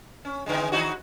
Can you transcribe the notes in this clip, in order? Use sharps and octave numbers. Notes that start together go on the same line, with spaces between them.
C#4
D3 E3 G#3
D#3 D#4 F#4